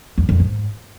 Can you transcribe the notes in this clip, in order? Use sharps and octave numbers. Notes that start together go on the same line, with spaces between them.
E2
F2
G#2